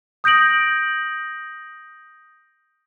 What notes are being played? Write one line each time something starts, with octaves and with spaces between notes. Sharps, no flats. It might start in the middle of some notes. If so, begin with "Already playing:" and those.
D#6 G6 A#6 D7 F#7